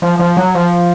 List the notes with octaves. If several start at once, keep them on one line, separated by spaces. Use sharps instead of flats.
F3
F3
F#3
F3